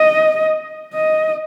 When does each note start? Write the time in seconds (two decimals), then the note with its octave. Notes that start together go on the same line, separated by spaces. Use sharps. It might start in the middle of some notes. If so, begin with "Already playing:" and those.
Already playing: D#5
0.94 D#5